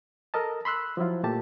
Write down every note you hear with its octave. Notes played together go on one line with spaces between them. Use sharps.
A4 A#4 D#5 A5
B5 C6 E6 F#6
F3 F#3 E4 F4
A#2 A3 G4 A5